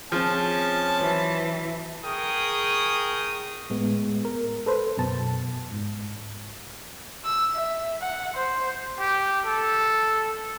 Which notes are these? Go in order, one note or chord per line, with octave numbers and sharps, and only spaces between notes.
F3 C4 C#4 G#4 A5
E3 F#3 C5 C#5
G#4 A#4 G5 C#6 D#6
A2 G#3 B3
A#4
A4 B4 C5
F#2 B2 A5
G#2
E6
E5
F#5
C5
G4
A4